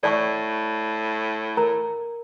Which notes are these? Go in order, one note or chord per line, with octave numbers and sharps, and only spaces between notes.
A2 D5 A5 C#6
A#4 A#5